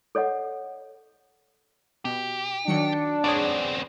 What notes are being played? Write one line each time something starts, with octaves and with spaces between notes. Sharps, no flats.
A4 C#5 D#5 F#5
B2 G4
D#3 F#3 D4 C#7
B3 C4 G#4 C#5 D5